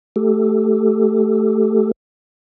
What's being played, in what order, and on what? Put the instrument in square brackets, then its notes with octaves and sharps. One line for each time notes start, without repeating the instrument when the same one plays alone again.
[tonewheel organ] A3 G4 A4